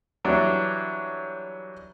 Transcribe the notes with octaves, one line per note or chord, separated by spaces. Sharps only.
E3 F#3 G3 D4